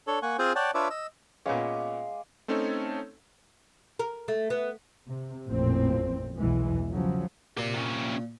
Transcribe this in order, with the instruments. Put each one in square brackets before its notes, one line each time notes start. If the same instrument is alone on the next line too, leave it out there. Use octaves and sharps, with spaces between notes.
[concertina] D4 A4 C#5
A#3 F#5 G#5 C#6
C4 F4 G#4 C5 G#5
C#5 D5 F#5 G5 A5
D4 F4 B4 C#5 E5 D6
D#5 E6
[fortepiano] A#2 B3 C#4 [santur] G#3 F5 D6
[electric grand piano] A3 C4 C#4 D#4 A4 C#5
[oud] A#4
A3
B3
[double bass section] C3
A1 F2 A#2 C4
B1 E2 E3 G#3
C#3 F3 F#3
[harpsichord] A#2 [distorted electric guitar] G4 C6
[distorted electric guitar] C3 C#4